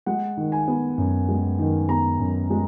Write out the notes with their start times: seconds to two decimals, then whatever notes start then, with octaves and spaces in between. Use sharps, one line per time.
0.06 G#3 F#5
0.37 D#3
0.52 G#5
0.68 B3
0.98 F#2
1.28 G#3
1.59 D#3
1.89 B3 A#5
2.19 F#2
2.50 G#3